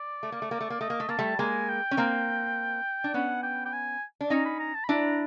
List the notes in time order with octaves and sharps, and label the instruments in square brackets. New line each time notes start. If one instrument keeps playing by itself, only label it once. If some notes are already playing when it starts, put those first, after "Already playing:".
Already playing: [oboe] D5
[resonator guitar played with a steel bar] A3
A#3
A3
A#3
A3
A#3
[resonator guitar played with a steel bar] A3 [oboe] D#5
[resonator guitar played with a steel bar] A#3
A3
[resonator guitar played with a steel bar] A#3 [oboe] A5
[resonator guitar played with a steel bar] G3 A3
[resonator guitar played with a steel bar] G#3 A#3 [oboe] G#5
[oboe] G5
[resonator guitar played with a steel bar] C#4
A#3 C4
D4
[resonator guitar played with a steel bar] B3 C#4 [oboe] F#5
[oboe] G5
G5
G#5
[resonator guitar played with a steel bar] D4
[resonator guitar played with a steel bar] C#4 D#4 [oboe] A#5
[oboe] B5
A#5
A5
B5
[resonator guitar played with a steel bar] D4 E4 [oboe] A#5